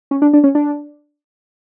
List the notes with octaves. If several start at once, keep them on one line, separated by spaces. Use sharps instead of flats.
C#4
D4
D4
C#4
D4